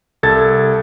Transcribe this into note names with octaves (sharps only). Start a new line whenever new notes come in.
C2 A4 G#6 A6